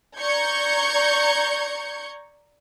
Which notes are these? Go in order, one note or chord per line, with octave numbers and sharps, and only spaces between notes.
D5 A#5 C#6 G6 G#6 C#7